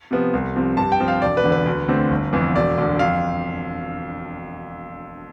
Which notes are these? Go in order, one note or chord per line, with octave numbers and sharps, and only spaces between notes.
C3 F3 B3
C2
C3 F3 C4
G2 A5
G5
F3 C4
F5
E1 D5
B4
E2 D3
B4
D2
D3 A3 C4
G1
F2 E3 B3
E1 D5
D2 D3
F2 F5